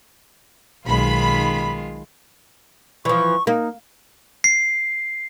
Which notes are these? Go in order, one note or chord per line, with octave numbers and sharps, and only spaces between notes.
B1 D#3 G#3 F4 B5
E3 F3 C#6
A#3 D#4
C7